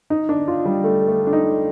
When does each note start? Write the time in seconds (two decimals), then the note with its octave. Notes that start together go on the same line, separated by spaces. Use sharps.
0.10 D#4
0.29 D4
0.48 F4
0.66 G3
0.84 A3
1.08 A3
1.27 D4
1.33 D#4